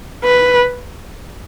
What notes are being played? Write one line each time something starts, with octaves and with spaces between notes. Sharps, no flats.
B4